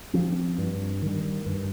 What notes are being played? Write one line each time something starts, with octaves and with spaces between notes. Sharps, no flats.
F3 C4
G2
D#3 G3
G2